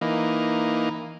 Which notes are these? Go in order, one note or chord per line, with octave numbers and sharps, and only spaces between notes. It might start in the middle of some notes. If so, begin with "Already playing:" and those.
E3 A#3 D#4